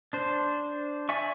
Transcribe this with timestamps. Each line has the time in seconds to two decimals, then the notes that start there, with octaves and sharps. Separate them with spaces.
0.13 D4 C5
1.09 D5 E5 G#5 C#6